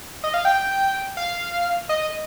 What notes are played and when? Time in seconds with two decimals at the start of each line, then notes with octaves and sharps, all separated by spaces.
0.24 D#5
0.34 F5
0.45 G5
1.17 F5
1.89 D#5